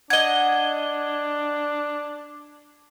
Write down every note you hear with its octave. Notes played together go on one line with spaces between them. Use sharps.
D4 D#5 F#5 G#6 G7